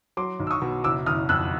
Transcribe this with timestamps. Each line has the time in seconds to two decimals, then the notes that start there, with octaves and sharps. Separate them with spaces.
0.17 F#3 C6 D6
0.40 B1
0.47 E6
0.51 C#6 D#6
0.62 B2
0.84 F#1 D6 E6
1.06 F#1 D#6 F6
1.29 F2 E6 F#6